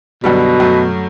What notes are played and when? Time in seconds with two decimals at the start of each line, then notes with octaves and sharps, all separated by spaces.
0.24 F#2 B2 D3 G3
0.60 F#2 F#3 A3